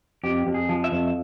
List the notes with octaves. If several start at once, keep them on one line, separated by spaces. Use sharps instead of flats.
F2 G4
F2
G#4
F3
E5
F2